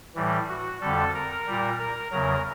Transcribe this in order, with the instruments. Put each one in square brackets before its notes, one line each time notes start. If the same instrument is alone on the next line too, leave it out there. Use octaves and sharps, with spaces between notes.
[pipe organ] A2 E3 G3
F#4
F2 D3 G3 A4
A#4
A#2 G3
A#4
E2 C#3 F#3 A#4